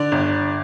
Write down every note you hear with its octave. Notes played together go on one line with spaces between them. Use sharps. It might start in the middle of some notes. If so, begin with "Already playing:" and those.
Already playing: D3 D5
G1